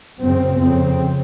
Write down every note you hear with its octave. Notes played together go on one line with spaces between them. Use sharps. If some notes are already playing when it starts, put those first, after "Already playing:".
F#2 C#3 C4
F2 C#3 C4